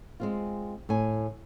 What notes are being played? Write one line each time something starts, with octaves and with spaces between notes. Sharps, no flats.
G#3 C4 F4
A2 G#5